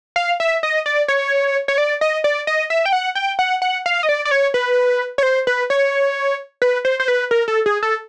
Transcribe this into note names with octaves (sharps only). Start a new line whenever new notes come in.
F5
E5
D#5
D5
C#5
C#5
D5
D#5
D5
D#5
E5
G5
F#5
G5
F#5
F#5
F5
D#5
D5
D5
C#5
B4
C#5
C5
B4
C#5
B4
C5
C5
B4
A#4
A4
G#4
A4